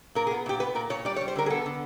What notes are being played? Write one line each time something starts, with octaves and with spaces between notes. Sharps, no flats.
A#2 A#4
G#4
B3
A#2 G4
B3 B4
A#2 A#4
A#2 C#5
G3 D5
C#5
G3
C5
D3 A#4
G#4
B3 A4
D3